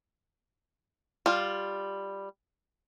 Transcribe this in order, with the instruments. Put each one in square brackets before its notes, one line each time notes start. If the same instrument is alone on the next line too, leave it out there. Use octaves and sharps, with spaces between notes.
[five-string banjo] G3 F4